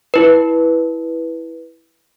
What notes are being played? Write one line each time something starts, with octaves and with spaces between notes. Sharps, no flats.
E4 B4